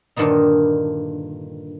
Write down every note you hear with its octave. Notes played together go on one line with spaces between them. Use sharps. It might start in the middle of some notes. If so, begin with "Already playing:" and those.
G2 A#2 D3 D#3 D#4